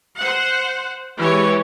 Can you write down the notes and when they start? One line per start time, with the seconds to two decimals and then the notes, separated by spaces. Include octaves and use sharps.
0.18 C5 F#5
1.17 E3 G#3 G4 C#5